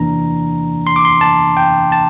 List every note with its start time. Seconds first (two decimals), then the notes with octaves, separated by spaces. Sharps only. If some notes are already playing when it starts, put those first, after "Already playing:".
Already playing: E2 C3 E3 A#3 D4 A#5
0.87 C6
0.96 D6
1.05 C6
1.21 A5
1.57 G5
1.92 A5